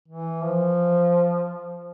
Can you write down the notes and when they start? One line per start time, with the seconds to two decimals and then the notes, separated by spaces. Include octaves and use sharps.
0.08 E3
0.43 F3